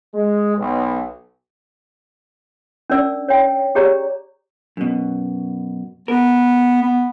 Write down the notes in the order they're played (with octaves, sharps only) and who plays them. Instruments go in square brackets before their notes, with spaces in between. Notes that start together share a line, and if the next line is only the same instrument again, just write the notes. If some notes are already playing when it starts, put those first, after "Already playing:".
[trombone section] G#3
B1
[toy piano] C#4 D4 A#4 D5 E6
C#5 G5
G4 G#4 C#5 D5 A#5
[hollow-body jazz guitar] F#2 B2
[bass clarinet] B3 [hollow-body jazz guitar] A#4
[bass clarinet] B3